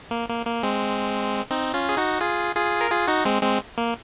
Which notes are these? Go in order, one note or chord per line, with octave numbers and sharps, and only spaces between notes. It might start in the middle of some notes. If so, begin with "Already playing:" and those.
A#3
A#3
A#3
G#3 C4
C4 D#4
C#4 F4
G#4
D#4 F#4
F4 G#4
F4 G#4
A#4
F4 G#4
D#4 F#4
G#3 C4
G#3 C4
A#3